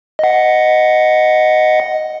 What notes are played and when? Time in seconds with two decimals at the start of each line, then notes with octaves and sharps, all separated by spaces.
0.19 D#5 F#5